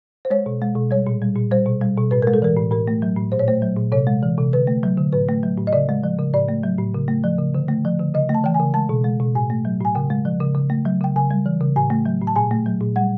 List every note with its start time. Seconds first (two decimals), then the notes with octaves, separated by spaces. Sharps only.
0.25 C5
0.30 G#3 C#5
0.46 B2
0.62 G#3
0.75 B2
0.91 G3 C#5
1.07 A#2
1.22 G3
1.36 A#2
1.51 G3 C5
1.66 B2
1.81 G3
1.97 B2
2.11 A2 B4
2.22 G#3 A#4
2.34 A4
2.42 E3 A#4
2.57 A2
2.71 A2 A#4
2.88 A3
3.02 F#3
3.17 A2
3.32 A#2 C5
3.39 C#5
3.48 A3 C5
3.62 F#3
3.77 A#2
3.92 C3 C#5
4.07 G#3
4.23 E3
4.38 C3
4.53 D3 B4
4.67 A3
4.83 F#3
4.97 D3
5.13 A2 B4
5.29 A3
5.43 F#3
5.58 A2
5.67 D#5
5.73 C#3 D5
5.89 G#3
6.04 F3
6.19 C#3
6.34 A2 D5
6.49 A3
6.63 F#3
6.78 A2
6.94 C#3
7.08 A3
7.24 F3
7.38 C#3
7.55 D3
7.68 A3
7.85 F3
8.00 D3
8.14 C#3 D#5
8.29 A3
8.35 A5
8.44 E3 G5
8.54 G#5
8.60 C#3
8.74 G#3 A5
8.89 B2
9.04 G#3
9.20 B2
9.35 A2 G#5
9.50 A3
9.65 F#3
9.80 A2 G#5
9.95 C#3 G5
10.10 G#3
10.25 F3
10.40 C#3
10.55 C#3
10.70 A3
10.85 F#3
11.01 C#3 G5
11.16 C#3 G#5
11.31 G3
11.46 E3
11.61 C#3
11.76 A2 G#5
11.90 A3
12.06 F#3
12.21 A2
12.27 A5
12.36 A#2 G#5
12.51 A3
12.66 F#3
12.81 A#2
12.96 G3 F#5